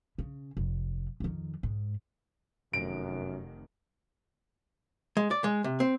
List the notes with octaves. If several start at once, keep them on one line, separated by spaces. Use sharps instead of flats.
C#3
F1
F2 D#3
G#2
F1 F#2 D#3 D7
G#3
D5
G#3
C3
C4